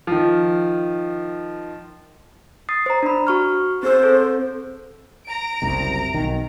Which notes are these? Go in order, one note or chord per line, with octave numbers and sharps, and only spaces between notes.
D#3 F3
D#6 A6 C7
C5 A#5
D4 B5
F#4 C#6 F6
C4 G#4 C5 E6
C4 A4
A#5 D7
F#1 C2 C3
B1 D#3